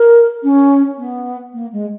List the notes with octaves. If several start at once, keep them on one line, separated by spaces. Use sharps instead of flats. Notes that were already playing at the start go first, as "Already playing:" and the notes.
Already playing: A#4
C#4
B3
A#3
G#3